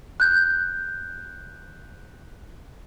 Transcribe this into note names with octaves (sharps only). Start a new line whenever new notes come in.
F#6 G6